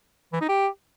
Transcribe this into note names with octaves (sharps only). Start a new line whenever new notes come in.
E3
D#4
G4